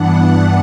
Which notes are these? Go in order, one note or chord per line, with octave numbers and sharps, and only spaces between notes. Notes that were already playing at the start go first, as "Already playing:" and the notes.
Already playing: G2 E3 B3 D4 F#5
F#5